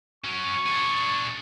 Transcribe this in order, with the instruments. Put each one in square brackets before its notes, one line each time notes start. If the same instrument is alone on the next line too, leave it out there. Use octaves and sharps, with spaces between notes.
[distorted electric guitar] F#3 C#4 [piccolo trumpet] C#6
[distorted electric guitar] D4 G#4